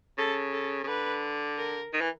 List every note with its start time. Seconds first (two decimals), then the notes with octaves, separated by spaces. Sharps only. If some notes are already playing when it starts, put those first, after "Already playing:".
0.18 C#3 A4
0.53 A4
0.84 C#3
0.88 D3 B4
1.58 A#4
1.94 D#3
2.01 E3